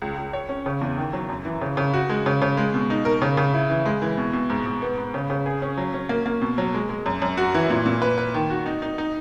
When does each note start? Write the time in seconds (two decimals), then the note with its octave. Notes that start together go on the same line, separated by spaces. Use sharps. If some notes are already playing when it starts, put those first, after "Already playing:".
0.02 C#2
0.18 C#2
0.33 C#5
0.49 C#4
0.66 C#3
0.81 E2
0.97 D#3
1.13 F#3
1.29 F#2
1.45 E3
1.61 C#3
1.77 C#3
1.94 F#4
2.09 G#3
2.26 C#3
2.42 C#3
2.57 G#3
2.74 B2
2.90 D#4
3.05 A#4
3.22 C#3
3.37 C#3
3.54 E4
3.70 E3
3.86 G#3
4.02 E3
4.18 B2
4.33 B2
4.50 G#2
4.66 G#2
4.82 B3
4.98 B3
5.14 C#3
5.30 C#3
5.46 G#4
5.62 C#4
5.78 F#3
5.94 C#4
6.09 A#3
6.26 A#3
6.42 B2
6.58 F#3
6.74 G#3
6.89 G#3
7.06 F#2
7.22 F#2
7.37 F#4
7.54 E3
7.70 A#2
7.86 A#2
8.02 B4
8.18 B4
8.34 D#3
8.50 F#4
8.66 D#4
8.82 D#4
8.98 D#4